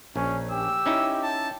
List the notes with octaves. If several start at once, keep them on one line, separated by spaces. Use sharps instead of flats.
A#1 C#4
G4 E6
C#4 D#4 E4
A5